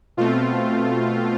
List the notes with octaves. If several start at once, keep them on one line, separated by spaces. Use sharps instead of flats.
B2 A3 C4 F4